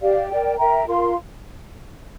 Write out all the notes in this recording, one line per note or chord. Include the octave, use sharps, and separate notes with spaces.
G4 D5 F5
A#4 D5 G5
A#4 E5 G5 A#5
F4 A#4 F5 C6